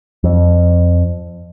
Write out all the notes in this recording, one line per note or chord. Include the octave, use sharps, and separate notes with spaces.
F2